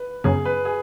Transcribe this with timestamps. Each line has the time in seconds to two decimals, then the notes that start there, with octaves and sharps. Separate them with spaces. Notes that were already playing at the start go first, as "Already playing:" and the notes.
Already playing: B4
0.24 F#2 C#3 F#3 B3 G#4
0.45 B4
0.65 G#4